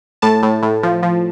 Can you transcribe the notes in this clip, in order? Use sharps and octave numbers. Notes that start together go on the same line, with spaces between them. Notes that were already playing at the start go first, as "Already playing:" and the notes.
A2 A5
A2
A2
F3
F3